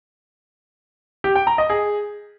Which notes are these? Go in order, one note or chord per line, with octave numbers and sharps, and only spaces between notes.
G4
G5
A#5
D#5
G#4